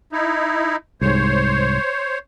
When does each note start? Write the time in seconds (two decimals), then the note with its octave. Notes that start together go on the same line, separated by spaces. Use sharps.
0.12 D#4 E4
1.01 C2 G#2 C5 C#5